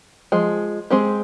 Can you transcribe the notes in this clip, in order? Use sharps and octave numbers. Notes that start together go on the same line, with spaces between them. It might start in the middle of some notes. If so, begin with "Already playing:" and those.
F3 G#3
G#3 C4 G4